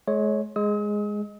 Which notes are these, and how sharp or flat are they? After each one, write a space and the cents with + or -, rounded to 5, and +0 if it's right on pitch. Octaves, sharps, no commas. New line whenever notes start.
G#3 +35 C#5 +0
G#3 +0 D#6 +45